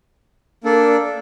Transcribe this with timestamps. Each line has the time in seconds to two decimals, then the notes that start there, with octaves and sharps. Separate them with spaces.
0.64 A#3 D4 A4 D5